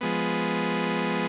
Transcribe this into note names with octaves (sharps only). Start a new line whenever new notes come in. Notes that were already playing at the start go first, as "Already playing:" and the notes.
F3 G#3 B3